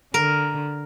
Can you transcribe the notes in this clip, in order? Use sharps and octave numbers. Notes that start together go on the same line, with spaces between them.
D3 A#4